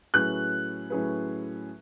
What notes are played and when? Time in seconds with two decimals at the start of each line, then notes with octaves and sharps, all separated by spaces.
0.14 A2 F#3 C#4 G#4 B4 F#6
0.90 A2 F#3 C#4 G#4 B4